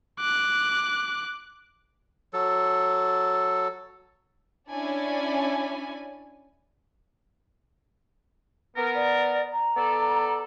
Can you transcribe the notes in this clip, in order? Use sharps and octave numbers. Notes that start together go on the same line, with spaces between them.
D6 F#6
F#3 A4
C#4 D4 E4 D5 G#5
B3 A#4
D5
A#5
B3 A4 D5